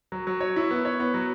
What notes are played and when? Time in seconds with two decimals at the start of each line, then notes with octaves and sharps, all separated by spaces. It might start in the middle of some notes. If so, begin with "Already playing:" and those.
0.12 F#3
0.27 F#3
0.40 C#5
0.56 E4
0.71 B3
0.85 C#5
1.00 B3
1.14 F#3